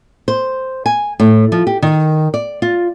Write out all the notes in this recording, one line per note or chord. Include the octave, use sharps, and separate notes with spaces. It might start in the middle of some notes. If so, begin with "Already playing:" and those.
C5
G#5
A2
F3
G4
D#3
D5
F4